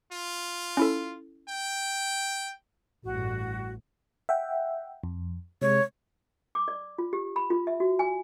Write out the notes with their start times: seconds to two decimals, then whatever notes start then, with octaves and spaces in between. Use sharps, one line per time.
0.12 F4
0.77 C#4 E4 A4
1.49 G5
3.05 A1 G2 F#4
4.29 E5 F#5 G5
5.04 F2
5.62 C3 G#3 C#5
6.55 D6
6.68 D5
6.98 F4
7.13 G4
7.36 B5
7.50 F4
7.67 E5
7.80 F#4
7.99 G#5